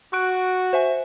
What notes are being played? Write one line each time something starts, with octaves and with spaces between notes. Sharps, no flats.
F#4 C#6 F#6 D7
C5 E5 G#5